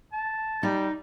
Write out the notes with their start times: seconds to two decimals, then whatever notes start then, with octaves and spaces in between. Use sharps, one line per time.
0.13 A5
0.63 G3 D#4